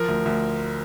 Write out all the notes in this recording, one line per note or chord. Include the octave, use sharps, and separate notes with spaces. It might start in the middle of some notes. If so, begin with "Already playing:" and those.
Already playing: F3 A#4
D2
D2